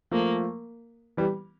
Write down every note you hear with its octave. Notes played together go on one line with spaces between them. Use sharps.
F3 A3 A#3
E3 G3